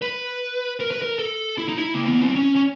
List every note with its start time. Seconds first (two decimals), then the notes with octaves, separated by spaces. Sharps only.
0.02 B4
0.80 A#4
0.91 B4
1.02 A#4
1.19 A4
1.58 E4
1.68 D#4
1.78 E4
1.94 A#3
2.07 B3
2.22 C4
2.35 C#4
2.55 C#4